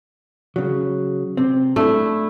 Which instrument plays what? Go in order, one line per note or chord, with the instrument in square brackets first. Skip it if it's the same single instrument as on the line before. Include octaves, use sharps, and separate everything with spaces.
[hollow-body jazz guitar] C#3 F#3
C3 C4
[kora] A3 [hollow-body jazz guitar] D4 E4